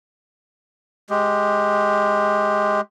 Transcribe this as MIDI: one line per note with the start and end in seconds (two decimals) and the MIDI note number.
1.10 2.81 56
1.10 2.81 67